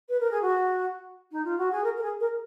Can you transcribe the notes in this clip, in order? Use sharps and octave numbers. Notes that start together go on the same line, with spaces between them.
B4
A#4
G#4
F#4
D#4
F4
F#4
G#4
A#4
A#4
G#4
A#4